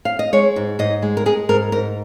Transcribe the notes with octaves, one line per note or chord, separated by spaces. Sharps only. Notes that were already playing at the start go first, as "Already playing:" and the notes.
F5
D#5
G#3 C#5
G#2
G#2 D#5
G#3
A#4
G#3 G#4
G#2 A#4
G#2 A#4